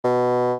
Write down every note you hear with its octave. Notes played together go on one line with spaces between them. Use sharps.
B2